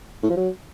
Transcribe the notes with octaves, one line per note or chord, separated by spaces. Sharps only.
A2
F3
F#3